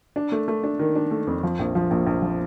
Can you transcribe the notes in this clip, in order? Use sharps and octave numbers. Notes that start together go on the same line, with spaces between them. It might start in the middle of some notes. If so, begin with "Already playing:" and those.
D4
A3
A3
D4
D#3
D4
A3
F2
F3
A#1
F3
A#1
A#1
F3